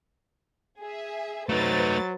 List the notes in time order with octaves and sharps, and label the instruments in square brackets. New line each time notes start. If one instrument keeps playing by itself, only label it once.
[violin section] G#4 E5
[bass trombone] F#3 [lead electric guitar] A3 D#4 [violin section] B4 C5 A6